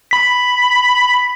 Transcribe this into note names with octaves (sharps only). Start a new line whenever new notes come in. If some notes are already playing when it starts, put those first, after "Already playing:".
B5 B6